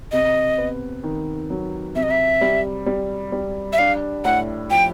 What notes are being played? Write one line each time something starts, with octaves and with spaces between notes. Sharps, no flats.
C3 D#5
B3
D#3
F#3
C3 E5
D#5
E5
G3
G3
G3
E5
D4 F5
A2 F#5
F3 G5